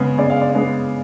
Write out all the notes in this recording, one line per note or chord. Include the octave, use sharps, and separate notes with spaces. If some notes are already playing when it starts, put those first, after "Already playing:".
Already playing: C#3 G#3 B3
C#3 D5
F5
D5
G#3 B3